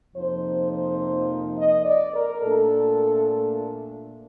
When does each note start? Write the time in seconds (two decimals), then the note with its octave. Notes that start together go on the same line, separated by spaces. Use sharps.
0.15 F2 C3 F3 A#3 D#4 C5
0.72 C5
1.57 D#5
1.85 D5
2.14 A#4
2.42 A#2 A3 D4 A4